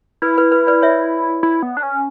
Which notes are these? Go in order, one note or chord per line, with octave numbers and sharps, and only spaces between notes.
E4 B4
B4
B4
B4 D5
C#5 E5
E4
B3
D4
C#4